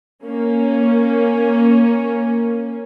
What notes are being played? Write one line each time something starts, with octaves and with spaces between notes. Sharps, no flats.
A#3 C#4